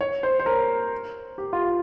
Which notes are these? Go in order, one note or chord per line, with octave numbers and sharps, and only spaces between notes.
C#5
C5
C5
A#4
G4
F4